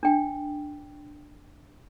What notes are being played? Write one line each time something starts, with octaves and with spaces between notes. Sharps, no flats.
D4 G5